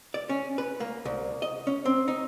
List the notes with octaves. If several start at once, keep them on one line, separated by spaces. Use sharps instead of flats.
D5
C#4
B4
A#3
C2
D#5
C#4
C4
D#4